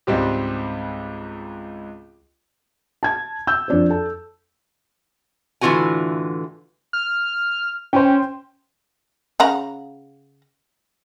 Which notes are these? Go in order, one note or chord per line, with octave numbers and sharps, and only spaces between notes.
C#2 G#2 G3 C4 G4
A5 G#6
E6 G6
F2 D4 C5
A4 A5
A2 D3 E3 F4 F#4 G#5
F6
C#4 C5 G5
C#3 F#5 A#5